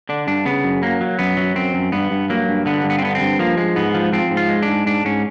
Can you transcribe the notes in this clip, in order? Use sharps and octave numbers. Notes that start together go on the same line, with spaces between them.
D3 D4
G2 D4
C#3 B3
F#2
F#3 A#3
F#3
F#2 B3
F#3
F#2 C4
F#2
G2 B3
G2
F#3 A#3
G2
D3 B3
G2
B3
C4
D3 B3
C4
G2
F3 A#3
G#3
G#2 B3
F3
F3 C4
G#2
F4
G#3
D4
G#2
G#2 D4
G#2 C#4